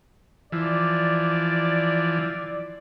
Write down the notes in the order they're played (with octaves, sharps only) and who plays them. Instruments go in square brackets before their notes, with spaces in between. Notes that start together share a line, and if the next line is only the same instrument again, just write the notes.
[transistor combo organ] E3 F3 [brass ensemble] D5